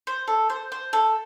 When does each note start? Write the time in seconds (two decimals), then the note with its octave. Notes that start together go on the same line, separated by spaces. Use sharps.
0.07 C5
0.28 A4
0.50 C5
0.72 C5
0.93 A4